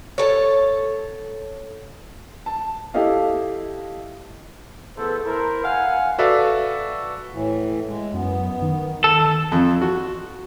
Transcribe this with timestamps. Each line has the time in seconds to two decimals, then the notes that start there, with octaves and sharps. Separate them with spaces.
0.18 A4 C#5
2.46 A5
2.94 E4 G4 A4 D#5 F5
4.97 E3 A3 B3 G#4 A4 C5
5.26 E4 A#4 C5
5.63 F5 F#5 G#5
6.19 F#4 A4 B4 D5 E5 F5
7.33 A2 E3
7.88 G#3
8.14 F#2 B3
8.62 D#3
9.04 A4
9.52 F2
9.82 F#4